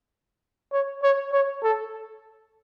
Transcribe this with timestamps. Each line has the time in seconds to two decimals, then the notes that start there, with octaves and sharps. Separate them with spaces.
0.72 C#5
1.03 C#5
1.32 C#5
1.63 A4